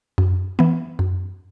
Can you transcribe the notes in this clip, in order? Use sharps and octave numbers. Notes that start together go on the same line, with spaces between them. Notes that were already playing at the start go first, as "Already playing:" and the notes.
F#2
E3 B3
F#2